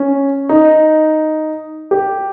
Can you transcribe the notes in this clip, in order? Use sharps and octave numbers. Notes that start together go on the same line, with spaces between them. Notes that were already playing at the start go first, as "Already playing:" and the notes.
Already playing: C#4
D#4
G4